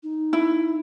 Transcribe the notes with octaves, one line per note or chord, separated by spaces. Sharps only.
D#4
E4